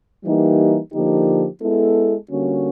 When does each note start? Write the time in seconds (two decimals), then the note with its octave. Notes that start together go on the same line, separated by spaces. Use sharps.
0.24 E3 G3 A#3 D#4 G4
0.92 D3 F3 A#3 D#4 G4
1.62 G#3 B3 E4 A4
2.31 D3 G3 A#3 C#4 F#4